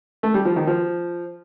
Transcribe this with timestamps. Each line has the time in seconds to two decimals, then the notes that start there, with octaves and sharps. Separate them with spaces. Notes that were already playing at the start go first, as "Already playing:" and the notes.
0.23 A3
0.34 G3
0.45 F3
0.56 D#3
0.67 F3